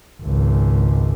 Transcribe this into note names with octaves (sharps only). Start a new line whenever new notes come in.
G#1 C#2